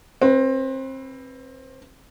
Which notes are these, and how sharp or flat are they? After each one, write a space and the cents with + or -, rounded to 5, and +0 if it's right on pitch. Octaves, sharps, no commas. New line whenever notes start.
C4 +25 B4 +0